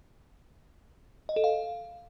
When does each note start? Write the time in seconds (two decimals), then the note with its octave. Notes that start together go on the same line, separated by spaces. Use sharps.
1.29 D#5
1.36 A4
1.44 F5